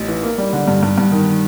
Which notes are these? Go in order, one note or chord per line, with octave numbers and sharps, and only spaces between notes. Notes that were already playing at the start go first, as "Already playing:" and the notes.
Already playing: A1
E3
A#3
G3
D3
G2
G2
G2
D#3